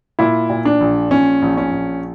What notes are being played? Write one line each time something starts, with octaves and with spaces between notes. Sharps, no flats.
A#2 E4
A#2
D4
A#1
A#1 C#4
A#1
C#4
A#1